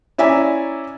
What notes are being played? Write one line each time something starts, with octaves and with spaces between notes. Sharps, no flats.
C#4 E4 D5 E5 G#5 A#5